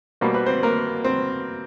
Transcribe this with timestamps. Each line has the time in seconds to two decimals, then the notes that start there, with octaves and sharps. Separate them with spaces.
0.21 B2 G3 A#3 C5
0.34 B4
0.46 C4 C5
0.63 A#3 A#4
1.04 C4 C5